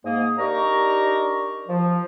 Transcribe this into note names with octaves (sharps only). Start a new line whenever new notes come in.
G#2 A#3 D#6
D4 D#4 G4 A#4 A#5 C#6
F3